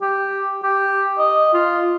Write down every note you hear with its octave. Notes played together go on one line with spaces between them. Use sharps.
G4
G4
D#5
F4